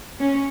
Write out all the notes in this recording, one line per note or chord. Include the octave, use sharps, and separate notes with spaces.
C#4